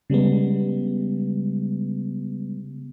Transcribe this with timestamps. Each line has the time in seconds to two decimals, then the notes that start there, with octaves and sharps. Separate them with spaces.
0.10 C#3 G3 G#3 B3